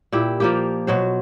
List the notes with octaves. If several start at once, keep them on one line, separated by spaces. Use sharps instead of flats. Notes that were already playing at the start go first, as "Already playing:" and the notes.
A#2 E4 G4
F3 A#3 G4
B2 F#3 C5